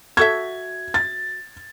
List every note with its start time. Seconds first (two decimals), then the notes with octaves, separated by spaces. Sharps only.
0.17 F#4 A4 E5 G#6
0.94 A6